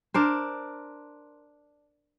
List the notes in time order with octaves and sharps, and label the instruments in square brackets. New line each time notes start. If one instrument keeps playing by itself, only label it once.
[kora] D4 A#4 C5